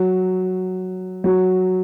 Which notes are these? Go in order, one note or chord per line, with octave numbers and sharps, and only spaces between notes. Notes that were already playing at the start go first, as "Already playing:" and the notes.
Already playing: F#3
F#3